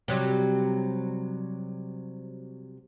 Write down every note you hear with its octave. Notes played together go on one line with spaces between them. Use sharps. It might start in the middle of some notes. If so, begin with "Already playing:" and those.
C3 F#3 G3